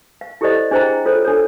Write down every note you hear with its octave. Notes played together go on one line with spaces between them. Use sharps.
F5
E4 G4 A4 C5 D5 D#5
D4 G#4 C5 D#5 G5 A#5
F4 A4 C5 C#5
D4 A4 C#5